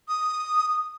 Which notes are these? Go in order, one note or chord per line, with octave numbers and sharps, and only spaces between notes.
D#6